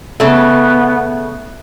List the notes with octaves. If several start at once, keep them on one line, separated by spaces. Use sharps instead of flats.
C#3 A3 B3